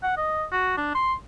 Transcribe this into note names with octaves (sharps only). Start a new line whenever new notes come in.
F#5
D#5
F#4
D4
C6